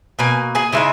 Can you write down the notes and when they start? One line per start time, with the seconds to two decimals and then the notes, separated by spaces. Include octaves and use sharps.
0.19 B2 A#3 G#5
0.55 G#4 G#5
0.72 C#3 G#3 D#4 E4 E5